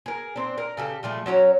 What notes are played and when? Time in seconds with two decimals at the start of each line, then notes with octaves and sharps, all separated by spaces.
0.06 G#4 A#4
0.36 C4 D4
0.58 A#4
0.77 C#3 G4 A4
1.03 F3 G3 A3 G#4
1.26 F#3 C#4 C#5 A#5